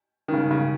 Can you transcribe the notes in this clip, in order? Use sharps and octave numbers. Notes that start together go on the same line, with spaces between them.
D#3
C#3
C#3